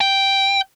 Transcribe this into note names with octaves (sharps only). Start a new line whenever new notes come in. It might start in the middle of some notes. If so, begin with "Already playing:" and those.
G5